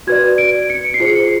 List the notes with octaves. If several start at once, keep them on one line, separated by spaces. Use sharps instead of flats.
F#4 B4 D5 G#6
D7
C#7
C7
F4 G#4 C5 C#7